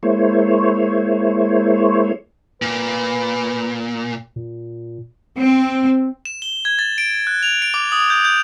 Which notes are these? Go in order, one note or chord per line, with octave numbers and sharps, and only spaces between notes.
G#3 A#3 E4 C5 C#5
A#2 B4
A#2
C4
E7
G7
G#6
A6
D7
F#6
F7
D7
D6
D#6
G6
G6